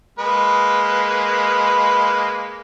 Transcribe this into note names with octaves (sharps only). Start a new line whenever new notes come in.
G#3 A#3 B4